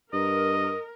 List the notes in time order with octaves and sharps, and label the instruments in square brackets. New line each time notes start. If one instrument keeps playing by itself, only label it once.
[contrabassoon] G2 [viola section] A#4 [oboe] D#5